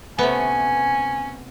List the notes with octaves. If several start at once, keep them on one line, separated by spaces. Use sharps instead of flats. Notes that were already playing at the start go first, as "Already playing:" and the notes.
C3 A3 B3 C#4 G#5